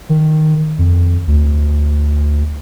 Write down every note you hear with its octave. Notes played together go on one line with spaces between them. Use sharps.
D#3
F2
D2